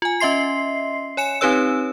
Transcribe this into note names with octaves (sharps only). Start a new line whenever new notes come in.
F4 G#5
C#4 D#5 E5 C6 C7
C#5 G#5 C#7 E7
C4 D#4 G4 B4 C#5 E6